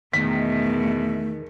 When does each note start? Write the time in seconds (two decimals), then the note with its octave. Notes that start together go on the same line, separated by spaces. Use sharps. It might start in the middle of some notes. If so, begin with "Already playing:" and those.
0.13 E2 B2 D#3 A3 B6